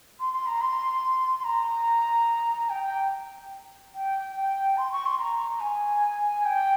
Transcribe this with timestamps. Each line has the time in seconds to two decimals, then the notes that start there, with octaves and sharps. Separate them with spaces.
0.20 C6
0.33 C6
0.46 A#5
0.61 C6
1.39 C6
1.44 A#5
2.70 G5
2.83 G5
3.95 G5
4.36 G5
4.77 C6
4.92 C#6
5.06 C6
5.19 A#5
5.60 G#5
6.45 G5